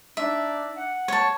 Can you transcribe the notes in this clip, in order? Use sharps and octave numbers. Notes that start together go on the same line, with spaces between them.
D4 D#4 D5 E5
F#5
C#5 A5